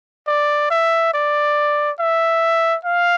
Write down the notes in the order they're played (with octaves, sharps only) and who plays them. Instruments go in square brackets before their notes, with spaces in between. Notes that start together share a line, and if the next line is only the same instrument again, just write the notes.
[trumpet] D5
E5
D5
E5
F5